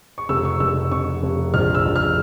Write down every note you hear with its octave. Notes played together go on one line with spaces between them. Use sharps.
C#6
F1 E6
C#6
F1 E6
F1 C#6
F1
A#1 F6
E6
A#1
F6